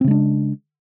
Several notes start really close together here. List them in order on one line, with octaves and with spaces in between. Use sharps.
C4 C#3 G#3 D4